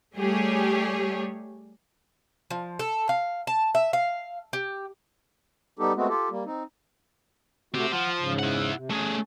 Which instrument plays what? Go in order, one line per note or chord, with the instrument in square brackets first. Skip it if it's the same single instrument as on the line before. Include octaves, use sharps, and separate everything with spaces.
[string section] G3 A3 G4 G#4 C#5
[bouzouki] F3
A4
F5
A5
E5
F5
G4
[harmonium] G3 B3 D#4 G4 A4
G#3 A3 B3 C4 F#4
F4 G4 A4
G3 A#3
C4 D#4
[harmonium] A3 F#4 [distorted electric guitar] C4 G4
[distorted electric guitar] F3 [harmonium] F#5
[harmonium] G#2 C#3
[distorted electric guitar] E4 F#5
[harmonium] C3
[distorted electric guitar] A3 G#4 [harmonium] C#4